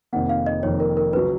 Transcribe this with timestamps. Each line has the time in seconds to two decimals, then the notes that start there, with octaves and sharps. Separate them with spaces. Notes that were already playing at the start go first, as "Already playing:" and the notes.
0.13 F1 F2 D#3 A#3 F#5
0.29 F5
0.46 D#5
0.63 F1 F2 D#3 A#3 C#5
0.80 A#4
0.97 A#4
1.13 C#2 C#3 F#3 B4